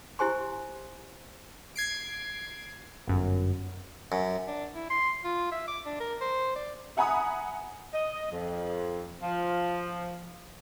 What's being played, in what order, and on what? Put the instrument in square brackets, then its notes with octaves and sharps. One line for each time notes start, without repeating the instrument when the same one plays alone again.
[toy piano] E4 G4 C5 G#5 C6
[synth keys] G#6 C7 D7
G1 F#2
[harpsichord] F#2
[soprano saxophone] D4
E4
C6
F4
E5
D6
D4
A#4
C5
D5
[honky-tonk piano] E5 F#5 G#5 A#5 B5 D#6
[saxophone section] D#5
F2
F3